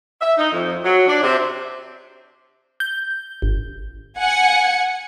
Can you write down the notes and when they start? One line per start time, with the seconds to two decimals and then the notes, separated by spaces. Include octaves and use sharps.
0.21 E5
0.38 D#4
0.52 F2
0.84 F#3
1.08 D4
1.23 C3
2.80 G6
3.42 G#1
4.19 F#5 G#5 C#7